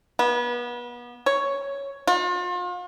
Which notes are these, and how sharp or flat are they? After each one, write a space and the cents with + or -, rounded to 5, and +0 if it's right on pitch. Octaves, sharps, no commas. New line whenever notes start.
B3 -30
C#5 +0
F4 +40